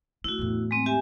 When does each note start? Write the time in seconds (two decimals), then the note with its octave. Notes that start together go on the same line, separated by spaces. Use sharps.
0.24 A3 C4 E4 F#4
0.39 E2 A2
0.71 G#3 C4
0.86 G4 E5 G#5